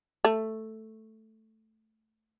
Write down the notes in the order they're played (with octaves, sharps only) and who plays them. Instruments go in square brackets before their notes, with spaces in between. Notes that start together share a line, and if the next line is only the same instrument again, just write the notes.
[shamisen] A3